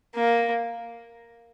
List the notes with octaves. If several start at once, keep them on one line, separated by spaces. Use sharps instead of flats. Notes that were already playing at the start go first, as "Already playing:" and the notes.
A#3